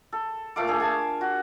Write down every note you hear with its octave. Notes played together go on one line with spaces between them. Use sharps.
A4
A#2 A3 F5 D6
A3 D4 G#4
G#5 A5
F#4